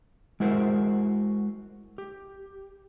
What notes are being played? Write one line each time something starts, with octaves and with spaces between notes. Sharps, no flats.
G#3 E4 F#4 A#4 C5
G4